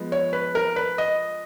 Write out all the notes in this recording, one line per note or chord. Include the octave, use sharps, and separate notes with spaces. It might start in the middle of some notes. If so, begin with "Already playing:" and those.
Already playing: F3 G#3 B3
C#5
B4
A#4
B4
D#5